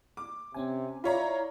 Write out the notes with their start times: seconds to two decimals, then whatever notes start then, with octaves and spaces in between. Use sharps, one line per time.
0.17 D6
0.54 C3 C4 C#4 G#5
1.04 E4 F4 C#5 D5 A#5 B5